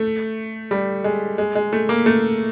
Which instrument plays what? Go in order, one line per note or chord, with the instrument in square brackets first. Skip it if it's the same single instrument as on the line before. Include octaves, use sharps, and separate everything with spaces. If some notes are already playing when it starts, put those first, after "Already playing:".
Already playing: [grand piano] A3
G3
G#3
G#3
G#3
A3
A#3
A3